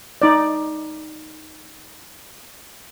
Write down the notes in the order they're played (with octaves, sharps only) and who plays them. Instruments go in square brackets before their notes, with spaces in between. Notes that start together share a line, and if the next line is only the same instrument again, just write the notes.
[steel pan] D#4 D5